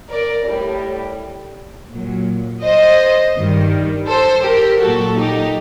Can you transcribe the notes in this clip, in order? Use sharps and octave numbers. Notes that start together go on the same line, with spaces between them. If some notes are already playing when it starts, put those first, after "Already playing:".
A#4 D5
A2 G3
A#2 F#3
C5 D#5
G2 D#3 G3
A4 C5
G4 A#4
A#2 F#3 F#4 A4
D#4 G4